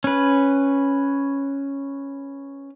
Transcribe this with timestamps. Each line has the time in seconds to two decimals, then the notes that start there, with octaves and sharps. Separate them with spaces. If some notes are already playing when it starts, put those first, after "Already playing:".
0.04 C#4 B4